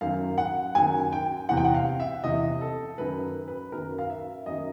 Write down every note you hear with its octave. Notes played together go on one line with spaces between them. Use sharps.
F#2 D#3 F#3 F5
F#5
F#2 D#3 F#3 G#5
G5
E2 C3 E3 F#5
G5
F#5
F5
E5
E2 C3 E3 D#5
A4
F#2 D#3 F#3 B4
B4
F#2 D#3 F#3 A#4
F5
E5
F#2 D#3 F#3 D#5